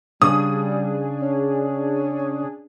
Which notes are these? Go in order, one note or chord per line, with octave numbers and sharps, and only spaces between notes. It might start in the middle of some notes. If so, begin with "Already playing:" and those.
C#3 G3 D4 G#4 D#6
C#4